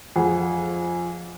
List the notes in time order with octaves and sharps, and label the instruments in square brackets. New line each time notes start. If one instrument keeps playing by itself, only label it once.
[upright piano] F2 G#4 F#5